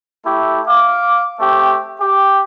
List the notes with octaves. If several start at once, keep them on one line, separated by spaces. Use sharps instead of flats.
A3 E4 G4
F5 D6
A3 C4 G4
G4